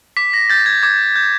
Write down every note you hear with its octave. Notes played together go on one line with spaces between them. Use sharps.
D6 B6
A#6
G6 A6
G#6
D6 G#6
G6